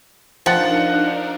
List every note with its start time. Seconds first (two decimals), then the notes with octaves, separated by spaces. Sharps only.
0.46 F3 D4 D#4 A#4 C5 F#5 A6